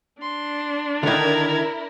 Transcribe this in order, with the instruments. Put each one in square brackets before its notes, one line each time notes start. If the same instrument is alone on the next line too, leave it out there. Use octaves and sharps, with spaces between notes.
[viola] D4 [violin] C6
[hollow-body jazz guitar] D3 D#3 [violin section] E4 A#4 [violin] G#6 F7